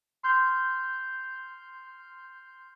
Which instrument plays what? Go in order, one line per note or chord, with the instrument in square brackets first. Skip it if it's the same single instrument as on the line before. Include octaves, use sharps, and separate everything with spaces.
[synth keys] C6 F6 G6